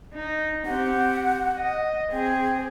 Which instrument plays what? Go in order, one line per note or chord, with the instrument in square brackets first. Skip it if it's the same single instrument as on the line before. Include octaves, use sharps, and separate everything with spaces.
[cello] D#4
[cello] C4 G4 [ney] F#5
[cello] D#5
[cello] C4 G#4 [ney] G5